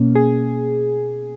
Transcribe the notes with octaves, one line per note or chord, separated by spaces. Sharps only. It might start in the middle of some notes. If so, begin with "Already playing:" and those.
Already playing: B2 A#3 C#4
G#4